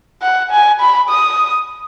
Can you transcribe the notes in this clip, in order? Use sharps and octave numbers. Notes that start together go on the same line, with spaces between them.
F#5
G#5
B5
D#6